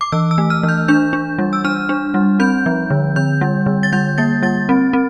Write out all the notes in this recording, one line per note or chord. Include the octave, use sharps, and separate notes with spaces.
D6
E3 E6
E6
A3
F6
E3
G6
D4 G6
D4
G3
E6
D4 F6
D4
G3
C4 G6
F3
D3
D3 G6
G3
D3
A6
G3 G6
A#3 A6
G3 A6
C4
C4